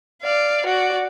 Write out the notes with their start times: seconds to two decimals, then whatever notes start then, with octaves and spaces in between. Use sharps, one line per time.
0.22 D5 F5
0.66 F#4 D5